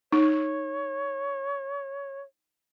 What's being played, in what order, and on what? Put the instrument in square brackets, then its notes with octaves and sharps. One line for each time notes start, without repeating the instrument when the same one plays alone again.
[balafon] D#4 [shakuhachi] C#5